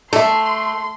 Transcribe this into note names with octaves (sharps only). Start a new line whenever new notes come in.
A3 A4 E5 C6